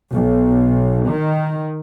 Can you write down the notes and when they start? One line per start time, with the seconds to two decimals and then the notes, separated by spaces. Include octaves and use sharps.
0.13 B1
1.08 D#3